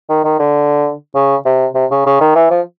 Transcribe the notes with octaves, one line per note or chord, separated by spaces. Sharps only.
D#3
D#3
D3
C#3
C3
C3
C#3
C#3
D#3
E3
F3